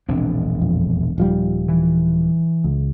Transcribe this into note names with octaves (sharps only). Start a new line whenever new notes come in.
E1 A#1 C4 D4
F2
D#1 F3 G3
E3
C#2